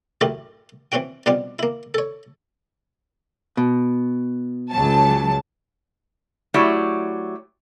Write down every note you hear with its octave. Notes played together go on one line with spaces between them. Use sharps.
A1 F#2 A3 E4 F4 G4
E3 C4 C#4 F#4 G5
B2 F3 G3 C4 D4 F4
A#3 E4
A4 C#5
B2
C#2 F#3 A5
F#3 A3 E4 G4 D5